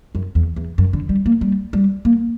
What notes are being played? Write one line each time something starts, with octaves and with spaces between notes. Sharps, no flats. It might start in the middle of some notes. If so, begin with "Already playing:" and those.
F#2
E2
E2
F#2
D3
G3
A#3
G3
G3
A#3